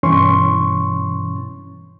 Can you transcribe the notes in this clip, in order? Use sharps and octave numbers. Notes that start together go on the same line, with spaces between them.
G2 B2 E3 C#4 C6 C#6